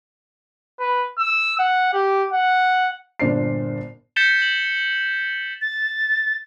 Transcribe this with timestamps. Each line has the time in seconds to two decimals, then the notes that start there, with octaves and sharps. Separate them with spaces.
0.80 B4
1.19 E6
1.59 F#5
1.93 G4
2.33 F#5
3.20 G1 A#2 D4 C5 C7
4.16 G6 A6 B6 C#7 E7 G7
4.42 F#7
5.61 A6